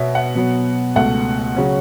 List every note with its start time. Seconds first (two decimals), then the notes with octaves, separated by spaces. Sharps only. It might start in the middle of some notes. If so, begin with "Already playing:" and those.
Already playing: B2 B3 C#5 E5
0.15 F#5
0.35 B2 F#3 B3
0.96 C#2 B2 A3 F#5
1.56 C#3 F#3 C#4